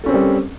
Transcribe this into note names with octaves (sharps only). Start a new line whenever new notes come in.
G3 C4 C#4 A4 A#4